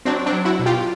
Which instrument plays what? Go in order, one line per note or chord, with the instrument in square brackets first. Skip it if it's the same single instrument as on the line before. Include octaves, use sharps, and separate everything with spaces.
[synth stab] F#3 C4 D4
C4 D4
F#3
E4 F#4
B2
F4 G4